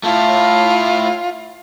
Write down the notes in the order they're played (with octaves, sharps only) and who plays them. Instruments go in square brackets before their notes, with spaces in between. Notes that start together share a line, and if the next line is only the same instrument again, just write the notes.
[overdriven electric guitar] A3 E4 [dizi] F4